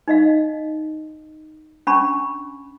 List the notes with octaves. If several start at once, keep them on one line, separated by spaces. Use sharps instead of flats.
D#4 D#5 F5
C#4 D4 B5 C#6